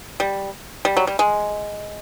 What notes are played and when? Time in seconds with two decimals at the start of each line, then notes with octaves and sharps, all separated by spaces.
0.20 G3
0.85 G3
0.97 F#3
1.07 G3
1.19 G#3